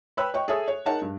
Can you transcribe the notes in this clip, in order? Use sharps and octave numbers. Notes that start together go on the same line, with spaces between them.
B4 C#5 G5 B5 E6 F#6
C#5 D#5 G5 C#6
G#4 A4 C#5 E5 G#5 D#6
C#5
D#4 G#4 A#4 C#5 F#5 A5
G2